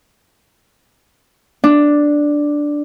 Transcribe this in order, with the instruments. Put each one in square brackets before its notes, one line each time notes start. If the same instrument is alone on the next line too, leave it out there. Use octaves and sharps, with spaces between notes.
[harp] D4